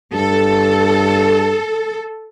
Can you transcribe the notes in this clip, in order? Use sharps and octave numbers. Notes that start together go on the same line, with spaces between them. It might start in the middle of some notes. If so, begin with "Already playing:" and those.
G2 A4